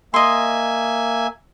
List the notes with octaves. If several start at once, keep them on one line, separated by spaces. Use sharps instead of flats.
A#3 D#5 E5 G#5 C6